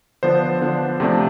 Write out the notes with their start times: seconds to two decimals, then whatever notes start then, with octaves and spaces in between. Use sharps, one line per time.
0.23 D3 F3 B3 D4 C5
0.61 D3 F3 B3 D4
1.00 C3 F3 A3 D4